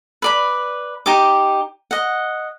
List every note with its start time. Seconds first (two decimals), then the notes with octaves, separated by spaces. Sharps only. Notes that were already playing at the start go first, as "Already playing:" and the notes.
0.22 B4 D5 B5
1.06 D#4 G4 D6
1.91 D#5 F#5